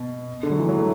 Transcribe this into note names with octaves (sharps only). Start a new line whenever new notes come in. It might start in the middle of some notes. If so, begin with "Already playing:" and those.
Already playing: B2
D3
F#3
E3
F#3
A3